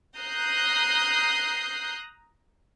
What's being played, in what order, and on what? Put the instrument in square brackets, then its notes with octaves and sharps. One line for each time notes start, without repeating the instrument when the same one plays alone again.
[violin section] A#5 D#6 F#6 G6 C7